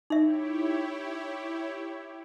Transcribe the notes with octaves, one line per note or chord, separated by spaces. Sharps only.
D#4 E4 G4 C#5 E5